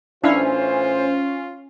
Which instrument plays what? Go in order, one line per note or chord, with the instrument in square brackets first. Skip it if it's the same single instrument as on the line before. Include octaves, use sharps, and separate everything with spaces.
[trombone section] A2 E3 C5 [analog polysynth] C#4 [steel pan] D4 E4 F5 [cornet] F4